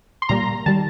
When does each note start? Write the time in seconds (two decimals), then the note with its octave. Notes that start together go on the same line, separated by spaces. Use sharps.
0.22 C6
0.29 A#2 G3 A#3 A#5
0.66 D#3 G3 A5